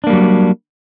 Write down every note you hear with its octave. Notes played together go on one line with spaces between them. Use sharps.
F#3 G3 A#3 D4